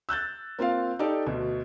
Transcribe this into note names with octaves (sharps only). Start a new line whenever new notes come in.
E6 F#6 G6 A6
A#3 C4 F4 F5
D#4 G4 A4 D5
D2 B2